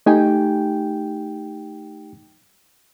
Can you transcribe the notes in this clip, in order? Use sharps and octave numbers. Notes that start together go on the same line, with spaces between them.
A3 D#4 G4 G5 G#5